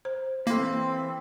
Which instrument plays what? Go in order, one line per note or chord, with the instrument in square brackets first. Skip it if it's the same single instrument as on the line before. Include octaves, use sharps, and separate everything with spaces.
[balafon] C5
[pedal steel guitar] E3 C6 [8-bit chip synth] A#3 [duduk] C4 [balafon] E4 A4